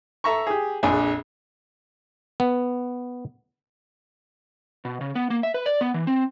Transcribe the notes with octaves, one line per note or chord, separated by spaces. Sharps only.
A4 E5 A#5 C#6
G4 G#4
A#1 F2 D4 G#4 G#5
B3
B2
C#3
B3
A#3
E5
B4
D5
B3
E3
C4